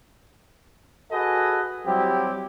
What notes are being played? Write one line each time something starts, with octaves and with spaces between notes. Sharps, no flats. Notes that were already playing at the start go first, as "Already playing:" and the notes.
F#4 G#4 A4 B4 D#5 G#5
F#3 G3 C4 E4 G4